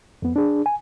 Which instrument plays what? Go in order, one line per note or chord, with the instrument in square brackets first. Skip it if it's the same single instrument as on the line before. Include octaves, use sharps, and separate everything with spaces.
[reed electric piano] F2 B3
D4 G#4
G#5